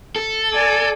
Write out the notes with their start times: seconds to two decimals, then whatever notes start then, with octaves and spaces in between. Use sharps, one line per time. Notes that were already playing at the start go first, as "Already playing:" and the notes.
0.16 A4
0.53 D5 G#5